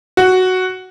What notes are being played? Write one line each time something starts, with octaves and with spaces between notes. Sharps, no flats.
F#4